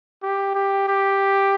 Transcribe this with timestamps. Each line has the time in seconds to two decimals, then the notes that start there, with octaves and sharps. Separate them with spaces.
0.23 G4
0.55 G4
0.88 G4